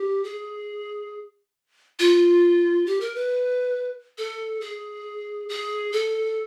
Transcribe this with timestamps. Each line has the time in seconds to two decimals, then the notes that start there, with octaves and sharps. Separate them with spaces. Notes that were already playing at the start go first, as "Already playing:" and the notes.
Already playing: G4
0.24 G#4
1.99 F4
2.86 G4
3.00 A#4
3.15 B4
4.18 A4
4.61 G#4
5.49 G#4
5.92 A4